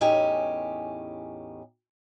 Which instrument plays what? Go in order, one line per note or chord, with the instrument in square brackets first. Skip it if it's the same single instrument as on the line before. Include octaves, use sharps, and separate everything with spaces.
[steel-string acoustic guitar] E2 A2 C#4 D#4 G4 G#5